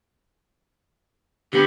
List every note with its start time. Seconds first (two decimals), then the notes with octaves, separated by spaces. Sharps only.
1.53 D3 B3 G4